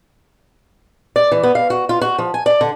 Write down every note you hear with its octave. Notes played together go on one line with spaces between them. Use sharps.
D5
E3
B3
F5
F#4
F4
F#4
F3
G#5
D5
D3